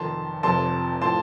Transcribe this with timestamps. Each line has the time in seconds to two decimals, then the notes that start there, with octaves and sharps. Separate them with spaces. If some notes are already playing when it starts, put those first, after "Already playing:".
Already playing: F1 F2 D#3 A5 C6
0.43 F1 F2 C3 F3 A5 C6
1.01 A2 F3 A5 C6